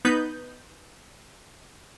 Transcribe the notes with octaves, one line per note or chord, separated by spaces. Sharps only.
B3 D#4 B4 G6